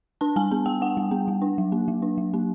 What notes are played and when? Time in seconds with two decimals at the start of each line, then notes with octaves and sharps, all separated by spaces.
0.21 D4 A5
0.36 G3 G#5
0.51 B3 G#5
0.66 G3 G5
0.81 D4 F#5
0.97 G3
1.11 B3
1.28 G3
1.42 D4
1.58 F#3
1.72 A#3
1.88 F#3
2.02 D4
2.18 F#3
2.34 A#3